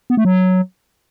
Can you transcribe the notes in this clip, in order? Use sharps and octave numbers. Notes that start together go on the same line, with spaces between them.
B3
A3
F#3